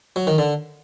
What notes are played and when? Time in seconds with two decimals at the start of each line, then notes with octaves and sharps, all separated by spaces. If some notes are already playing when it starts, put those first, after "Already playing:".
0.16 F#3
0.27 D#3
0.38 D3